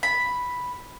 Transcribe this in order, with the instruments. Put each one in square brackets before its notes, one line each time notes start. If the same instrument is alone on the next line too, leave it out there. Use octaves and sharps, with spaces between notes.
[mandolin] B5